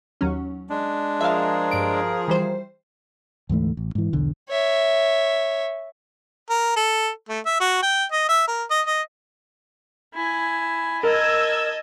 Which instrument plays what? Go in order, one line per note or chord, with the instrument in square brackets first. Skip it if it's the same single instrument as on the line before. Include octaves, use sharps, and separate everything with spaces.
[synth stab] D#2 F#3 C#4
[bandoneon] G#3 D4
[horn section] F3 G#4 A#4 [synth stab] E5 F5
[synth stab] G2 D7
E3 G3 C5
[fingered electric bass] D2 G#2 E3 A3
A1
G#2 E3
B1 E2 D3
[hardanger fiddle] C#5 E5
[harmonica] A#4
A4
A3
E5
F#4
G5
D#5
E5
A#4
D#5
D#5
[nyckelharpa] E4 G#5
[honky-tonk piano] A#4 [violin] D#5 [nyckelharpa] A5 [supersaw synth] E6 G#6